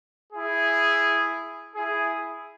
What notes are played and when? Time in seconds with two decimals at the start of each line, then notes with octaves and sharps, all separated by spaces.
0.32 E4 G#4
1.76 E4 G#4